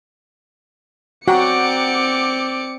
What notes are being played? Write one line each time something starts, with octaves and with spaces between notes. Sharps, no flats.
C4 F#4 D5 F#5 G5 A#5 D6 C#7